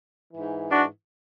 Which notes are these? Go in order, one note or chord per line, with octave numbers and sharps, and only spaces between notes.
G#2 E3
D4 F#4